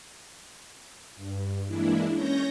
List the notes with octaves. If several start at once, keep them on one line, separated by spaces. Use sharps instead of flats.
G2
E3 G#3 A#3 D4 E4
C#4 C#5 G6 A#6